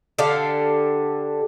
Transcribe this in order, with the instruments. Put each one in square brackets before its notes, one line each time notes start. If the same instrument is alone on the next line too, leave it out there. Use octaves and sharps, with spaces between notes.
[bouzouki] D3 G4 A4 F5